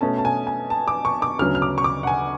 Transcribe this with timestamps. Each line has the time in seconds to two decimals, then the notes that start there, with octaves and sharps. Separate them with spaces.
0.01 B2 A3 C#4 A5
0.18 A5
0.25 G#5
0.47 G#5
0.70 A5
0.88 D6
1.05 C#6
1.22 D6
1.39 D2 C#3 F#3 B3 F6
1.55 F6
1.62 D6
1.78 C#6
1.84 D6
2.03 F#5
2.07 G#5